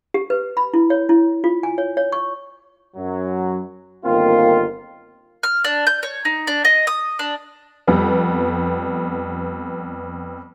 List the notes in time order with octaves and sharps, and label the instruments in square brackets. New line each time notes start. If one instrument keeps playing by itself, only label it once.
[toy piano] G4
B4
B5
E4
C#5
E4
F4
G#5
C#5
C#5
C#6
[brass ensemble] F#2 F#3
G1 D#3 A#3 C4 F4
[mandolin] F6
D4
G6
C#5
D#4
D4
D#5
D#6
D4
[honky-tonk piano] F2 G3 B3